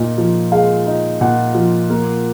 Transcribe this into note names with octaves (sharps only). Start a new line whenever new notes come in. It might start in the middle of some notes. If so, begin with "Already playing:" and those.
Already playing: A#2 D#4
F3
G#3 F5
D#4
A#2 F#5
F3
A#3